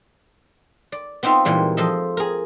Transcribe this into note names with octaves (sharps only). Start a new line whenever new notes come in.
D5
B3 C4 D#4 F4 E5
A#2 E3 G3 G#3
F3 A4 D#5 E5
G#4 A#4